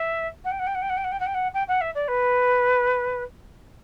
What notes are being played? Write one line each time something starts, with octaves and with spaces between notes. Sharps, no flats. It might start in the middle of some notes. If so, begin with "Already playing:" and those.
Already playing: E5
F#5
G5
F#5
G5
F#5
G5
F#5
G5
F#5
G5
F#5
G5
F#5
G5
F#5
E5
D5
B4